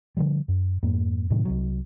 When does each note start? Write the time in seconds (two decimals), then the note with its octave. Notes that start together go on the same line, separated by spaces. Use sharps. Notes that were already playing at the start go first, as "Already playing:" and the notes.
0.17 D3 F3 G3
0.48 F#2
0.83 F2 G#2 A#3
1.30 A2 C3 D#3 F#3
1.45 C2 C3 F#3